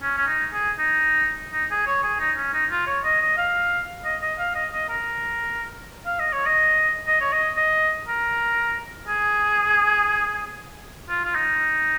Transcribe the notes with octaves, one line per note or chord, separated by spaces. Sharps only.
C#4
C#4
D#4
G#4
D#4
D#4
G#4
C#5
G#4
D#4
C#4
D#4
F4
C#5
D#5
D#5
F5
D#5
D#5
F5
D#5
D#5
A#4
F5
D#5
C#5
D#5
D#5
C#5
D#5
D#5
A#4
G#4
F4
F4
D#4